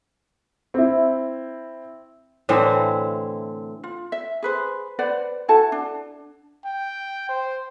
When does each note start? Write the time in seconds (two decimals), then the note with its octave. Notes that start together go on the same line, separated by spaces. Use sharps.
0.74 C4 E4
2.49 A2 D3 E3 C4
3.84 F4
4.12 E5
4.43 G#4 B4 C5
4.99 B4 C5 D5 F#5
5.48 E4 F#4 A4 A5
5.72 D4
6.65 G5
7.29 C5